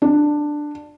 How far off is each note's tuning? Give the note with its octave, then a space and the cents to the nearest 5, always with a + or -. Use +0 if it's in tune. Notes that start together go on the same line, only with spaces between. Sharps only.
D4 +10